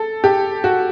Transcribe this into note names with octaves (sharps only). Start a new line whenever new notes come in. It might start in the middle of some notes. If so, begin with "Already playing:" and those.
Already playing: A4
G4
F#4